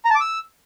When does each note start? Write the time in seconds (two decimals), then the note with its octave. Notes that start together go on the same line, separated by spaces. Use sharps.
0.05 A#5
0.10 A5
0.15 D6
0.20 E6